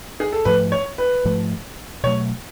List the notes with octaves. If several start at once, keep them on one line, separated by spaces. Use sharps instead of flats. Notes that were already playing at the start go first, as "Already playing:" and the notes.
G#4
A4
G#2 F3 A3 B4
C#5
B4
G#2 F3 A3
B2 F#3 A3 C#5